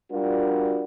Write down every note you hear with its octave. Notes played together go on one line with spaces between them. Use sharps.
G3 D4 F4 F#4 A#4